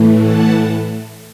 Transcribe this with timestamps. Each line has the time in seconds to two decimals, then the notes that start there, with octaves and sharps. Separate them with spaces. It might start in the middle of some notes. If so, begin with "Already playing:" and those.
Already playing: A2 E3 A3
0.21 F#5 A5